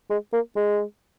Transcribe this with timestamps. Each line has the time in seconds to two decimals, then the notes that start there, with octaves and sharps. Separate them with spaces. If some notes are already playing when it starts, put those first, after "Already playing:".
0.10 G#3
0.33 A#3
0.56 G#3